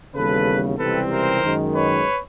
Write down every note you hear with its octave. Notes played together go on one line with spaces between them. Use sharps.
D#2 C#3 E3 G3 B3 A4 B4
C#2 C3 E3 G3 C4 A4 B4
A#4 C5
F#2 D#3 G#3
B4 C#5